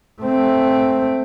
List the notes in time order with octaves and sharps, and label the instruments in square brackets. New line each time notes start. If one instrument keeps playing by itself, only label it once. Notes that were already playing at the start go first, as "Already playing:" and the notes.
[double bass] A3 C4